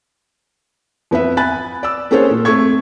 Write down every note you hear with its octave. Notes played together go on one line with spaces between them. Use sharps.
F2 B3 B4 E5
G#5 B5 F#6 A6
D5 E6
A#3 C#4 G#4 A4 C5 C#5
A#2
A3 C4 C#6 G#6